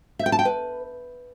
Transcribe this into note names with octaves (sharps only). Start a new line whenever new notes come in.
E5
G5
A5
G5
B4